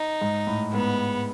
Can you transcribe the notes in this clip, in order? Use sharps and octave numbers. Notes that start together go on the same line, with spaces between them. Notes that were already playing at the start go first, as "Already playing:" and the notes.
Already playing: D#4
G#2
A2
G#2 B3